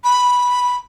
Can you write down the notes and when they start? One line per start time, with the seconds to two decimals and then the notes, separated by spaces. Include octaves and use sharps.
0.04 B5